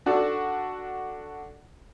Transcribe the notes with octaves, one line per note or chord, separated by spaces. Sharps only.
D4 F#4 A4 D5